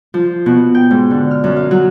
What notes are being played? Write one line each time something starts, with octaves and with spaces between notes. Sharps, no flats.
F3
B2
G5
G#2
D3
F6
F#2
F5
F#3